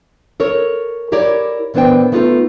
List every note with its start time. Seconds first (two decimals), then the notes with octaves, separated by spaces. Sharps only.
0.40 A4 A#4 C#5
1.12 E4 G4 A#4 C#5 D5
1.74 A#2 E3 B3 D4 C5 G5
2.12 A3 B3 D#4 F4 G#4 A4